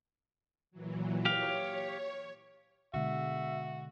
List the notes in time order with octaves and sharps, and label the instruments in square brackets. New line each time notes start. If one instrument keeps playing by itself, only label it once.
[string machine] A#2 E3 F#3
[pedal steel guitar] G4 F5 [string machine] C#5
[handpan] B2 D3 G#3 [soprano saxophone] F#4 [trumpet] E5